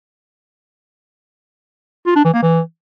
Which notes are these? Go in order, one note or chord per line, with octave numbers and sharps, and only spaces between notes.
F4
D4
E3
A#3
E3